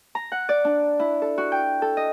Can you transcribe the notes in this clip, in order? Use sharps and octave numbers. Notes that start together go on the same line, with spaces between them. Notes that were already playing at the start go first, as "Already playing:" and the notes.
A#5
F#5
D5
D4
E4
A4
F#4
G5
A4
D#5